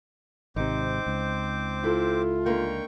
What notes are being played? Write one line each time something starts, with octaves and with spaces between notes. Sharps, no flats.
G#1 C3 C4 D#4 C5 D6
C#2
E4 F4 A4
D3 A#3 D#4 G5 C#6